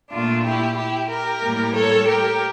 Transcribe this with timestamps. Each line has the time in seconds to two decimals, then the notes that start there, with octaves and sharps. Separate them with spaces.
0.11 A#2 A3 D4 F4
0.44 E4 G4
0.77 E4 G4
1.10 G4 A#4
1.43 A2 G3 A#3
1.75 A4 C#5
2.08 G4 A#4